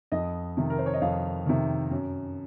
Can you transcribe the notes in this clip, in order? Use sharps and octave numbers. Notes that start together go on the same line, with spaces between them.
F2 D#5
C3 D#3
A#4
C5
C#5
D#5
F2 F5
C3 D#3
F#2